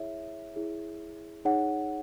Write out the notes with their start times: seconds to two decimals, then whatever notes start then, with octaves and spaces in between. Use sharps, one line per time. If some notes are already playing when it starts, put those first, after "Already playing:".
Already playing: E4 G#4 C#5 E5
0.55 E4 G#4 C#5
1.45 D#4 G#4 C#5 F#5